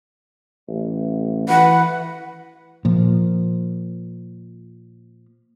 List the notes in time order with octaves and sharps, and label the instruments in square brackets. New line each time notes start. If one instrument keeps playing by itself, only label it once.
[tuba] A1
[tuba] E3 [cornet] B4 [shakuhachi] F#5
[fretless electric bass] A#2 F3